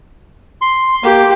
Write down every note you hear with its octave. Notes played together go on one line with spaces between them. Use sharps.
C6
A#3 G4